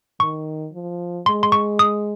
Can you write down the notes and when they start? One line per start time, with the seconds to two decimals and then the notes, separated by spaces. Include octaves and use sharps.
0.20 D#3 C#6
0.74 F3
1.26 G#3 C6
1.43 C6
1.52 C#6
1.79 D#6